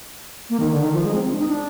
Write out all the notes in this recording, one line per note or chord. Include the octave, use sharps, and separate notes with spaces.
A#3
D#3
D3
D#3
F3
G#3
C4
D4
D#4
D4